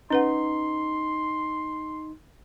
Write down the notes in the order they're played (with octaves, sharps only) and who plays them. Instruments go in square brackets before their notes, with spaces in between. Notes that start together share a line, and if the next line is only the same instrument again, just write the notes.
[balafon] C#4 B4 F#5 [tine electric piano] D#4 [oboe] C6